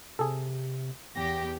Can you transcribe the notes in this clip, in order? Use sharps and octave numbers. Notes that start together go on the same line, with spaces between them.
C3 G#4 A4
E2 G4 A#6